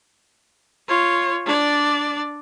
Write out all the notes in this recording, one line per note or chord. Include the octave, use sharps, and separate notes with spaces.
F4 C#5
D4 D5